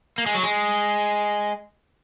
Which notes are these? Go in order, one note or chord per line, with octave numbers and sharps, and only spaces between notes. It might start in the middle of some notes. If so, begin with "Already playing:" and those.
A#3
G#3
F#3
G#3